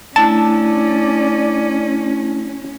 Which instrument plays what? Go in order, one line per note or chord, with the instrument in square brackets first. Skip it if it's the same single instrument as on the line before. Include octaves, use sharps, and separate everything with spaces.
[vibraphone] A3 D4 E4 [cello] C#4 [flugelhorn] D5 [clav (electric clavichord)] A5